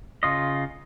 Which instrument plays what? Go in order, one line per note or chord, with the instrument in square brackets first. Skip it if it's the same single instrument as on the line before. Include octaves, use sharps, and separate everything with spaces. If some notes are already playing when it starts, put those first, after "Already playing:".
[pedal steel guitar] C#3 F4 D#5